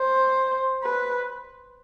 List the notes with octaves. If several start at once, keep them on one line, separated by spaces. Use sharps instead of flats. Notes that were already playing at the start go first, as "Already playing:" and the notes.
Already playing: C5
B4